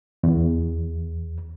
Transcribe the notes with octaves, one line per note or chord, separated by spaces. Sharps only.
E2